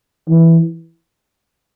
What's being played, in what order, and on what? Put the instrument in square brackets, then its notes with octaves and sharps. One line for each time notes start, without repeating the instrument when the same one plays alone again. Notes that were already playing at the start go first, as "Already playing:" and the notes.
[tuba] E3